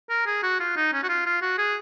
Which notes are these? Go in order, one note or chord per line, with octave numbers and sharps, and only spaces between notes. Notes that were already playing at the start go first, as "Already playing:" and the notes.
A#4
G#4
F#4
F4
D#4
C#4
F#4
F4
F4
F#4
G#4